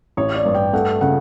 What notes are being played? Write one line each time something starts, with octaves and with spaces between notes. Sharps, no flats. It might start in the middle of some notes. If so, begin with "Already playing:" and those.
A1 C#5
D5
G2
G5
A3 F#5
C#3 F#5